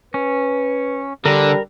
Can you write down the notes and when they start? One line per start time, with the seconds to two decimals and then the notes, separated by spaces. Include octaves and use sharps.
0.14 C#4 B4
1.26 D3 G3 A#4 A#5